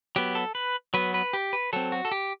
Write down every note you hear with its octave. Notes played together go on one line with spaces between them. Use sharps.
F#3 B3 G4
A4
B4
F#3 B3 B4
B4
G4
B4
F#3 C4 A4
F#4
A4
G4